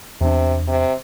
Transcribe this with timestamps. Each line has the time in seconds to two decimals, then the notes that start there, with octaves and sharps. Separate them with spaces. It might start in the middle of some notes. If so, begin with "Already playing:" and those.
0.21 E2 C3 D4
0.67 C3